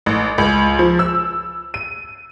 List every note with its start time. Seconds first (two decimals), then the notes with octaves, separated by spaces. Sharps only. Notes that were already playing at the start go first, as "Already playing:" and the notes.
0.06 A1
0.38 C#2
0.79 F3
0.99 E6
1.74 D#7